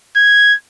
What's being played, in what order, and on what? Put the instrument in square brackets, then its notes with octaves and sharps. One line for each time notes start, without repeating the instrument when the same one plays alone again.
[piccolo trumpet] G#6